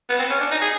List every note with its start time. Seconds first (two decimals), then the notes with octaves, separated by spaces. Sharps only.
0.09 B3
0.19 C4
0.30 C#4
0.40 D4
0.51 D#4
0.62 G#4